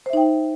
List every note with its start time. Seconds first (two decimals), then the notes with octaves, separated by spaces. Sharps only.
0.06 C5
0.10 E5
0.13 D#4
0.17 G5